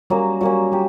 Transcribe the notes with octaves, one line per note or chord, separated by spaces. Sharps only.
F#3 G3 A#3 C#4
F#3 G3 A#3 C#4
G3 G4